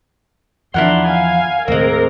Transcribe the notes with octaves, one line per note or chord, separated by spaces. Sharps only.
E2 D#3 F3 D4 E4 A#4 F#5 C6
F5 G#5
D#2 A2 G#3 A#3 C4 A#4